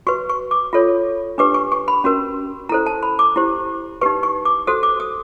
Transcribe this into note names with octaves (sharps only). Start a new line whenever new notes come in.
F#4 B4 C#6
C#6
D6
F4 A4 C#5
D4 G4 B4 D6
C#6
C#6
B5
C#4 F#4 A#4
E4 A4 C5 A#5
A5
B5
D6
E4 G4 C5
D#4 G4 B4 C#6
C#6
D6
F#4 A4 C5 D#6
D6
D#6